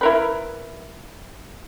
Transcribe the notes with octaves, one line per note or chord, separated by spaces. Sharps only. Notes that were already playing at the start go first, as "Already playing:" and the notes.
E4 A#4 B4